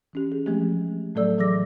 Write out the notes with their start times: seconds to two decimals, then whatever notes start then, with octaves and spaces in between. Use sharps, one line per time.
0.13 E3 C#4 G4
0.32 G#4
0.46 F3 G#3 A3 C4 G4
1.15 A2 F#3 A3 A4 D5 E6
1.38 E3 F#3 G#4 D6 E6 A#6